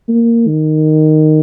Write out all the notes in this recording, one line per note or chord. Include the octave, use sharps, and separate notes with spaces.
A#3
D#3